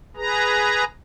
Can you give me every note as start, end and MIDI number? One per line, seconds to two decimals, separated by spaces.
0.17 0.84 68
0.17 0.84 71
0.17 0.84 82